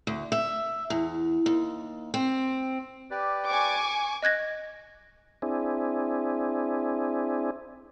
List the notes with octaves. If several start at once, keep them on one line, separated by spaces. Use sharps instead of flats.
D2
E5
E2
D#2
C4
G4 B4 D5
G#5 C#6 D6
D#5 F#6 G#6 A#6
C4 D4 E4 G#4